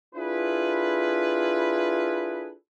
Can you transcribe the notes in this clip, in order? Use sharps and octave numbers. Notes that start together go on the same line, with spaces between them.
D4 E4 F4 G#4 A4 B4